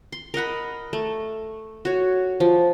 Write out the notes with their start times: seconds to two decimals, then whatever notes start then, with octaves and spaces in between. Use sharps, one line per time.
0.12 C6
0.34 A#4 D#5 F#5 B5
0.93 A3
1.85 F#4 C#5
2.40 F3